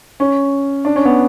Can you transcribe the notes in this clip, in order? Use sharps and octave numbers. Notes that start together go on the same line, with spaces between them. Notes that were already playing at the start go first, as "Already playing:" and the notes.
C#4
D4
C#4
B3